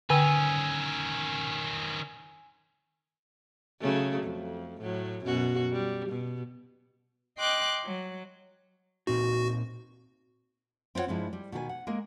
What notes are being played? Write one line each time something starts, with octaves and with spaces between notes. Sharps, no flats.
D3 D#3 C#4 G5 G#5 E6
C#3 F#3 A3
F2
A2 F#3
F#2 B2 F#4
G3
B2
D#5 G5 C6 D6 F#6
F#3
A#2 C4 D#4 F#4
C4 E4 F4 C#5 F#5
G2 F3 G#3 E4
G3
B2 D#3 A4 G#5
F#5
G#3 A#3 A#4